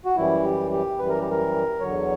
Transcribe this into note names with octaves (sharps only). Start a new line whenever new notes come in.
F#4
F#2 E3 G3 E4
G4
G4
F#2 E3 G3 B4
A#4
G4
A#4
E2 D3 F#3 C#5